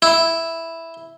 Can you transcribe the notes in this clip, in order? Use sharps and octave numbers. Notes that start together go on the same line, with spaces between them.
E4